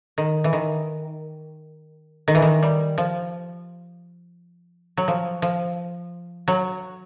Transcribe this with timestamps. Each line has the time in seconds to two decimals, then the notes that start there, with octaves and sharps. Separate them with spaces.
0.18 D#3
0.44 E3
0.53 D#3
2.28 D#3
2.35 E3
2.42 D#3
2.63 G3
2.98 F3
4.97 F#3
5.08 F3
5.42 F3
6.48 F#3